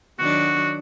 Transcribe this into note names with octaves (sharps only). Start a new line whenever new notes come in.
D#3 F#3 D4 F#4